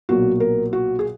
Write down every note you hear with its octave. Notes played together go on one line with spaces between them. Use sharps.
B1 A#2 F#3 F#4
A#4
F#4
G#4